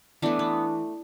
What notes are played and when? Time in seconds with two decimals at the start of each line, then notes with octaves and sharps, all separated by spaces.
0.22 E3 A3 B3 D4
0.39 B3